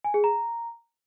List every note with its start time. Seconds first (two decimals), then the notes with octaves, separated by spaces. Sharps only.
0.04 G#5
0.14 G#4
0.24 A#5